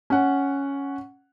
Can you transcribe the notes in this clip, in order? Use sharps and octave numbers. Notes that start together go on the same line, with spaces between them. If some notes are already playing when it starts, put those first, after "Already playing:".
C#4 F#5